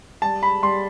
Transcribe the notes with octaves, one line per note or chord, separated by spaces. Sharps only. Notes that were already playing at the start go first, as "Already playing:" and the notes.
G3 A5
B5
G3 C6